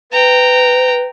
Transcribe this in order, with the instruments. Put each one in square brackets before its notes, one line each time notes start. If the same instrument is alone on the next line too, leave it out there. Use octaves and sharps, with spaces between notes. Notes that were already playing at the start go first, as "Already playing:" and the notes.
[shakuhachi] B4 [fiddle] G5 A#5